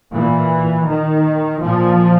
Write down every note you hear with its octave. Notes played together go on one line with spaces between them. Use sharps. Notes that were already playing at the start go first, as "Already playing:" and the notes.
A#2 E3
D#3
A#2 F3